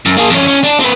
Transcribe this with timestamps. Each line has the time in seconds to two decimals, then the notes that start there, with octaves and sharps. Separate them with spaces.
0.06 F#2
0.18 A#3 G#4
0.30 F2 C#4
0.47 C#4
0.64 D4
0.80 C4 B4